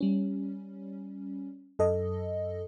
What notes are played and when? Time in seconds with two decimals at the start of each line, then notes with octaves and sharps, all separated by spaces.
0.01 G3 C#4
1.79 F#2 A4 D#5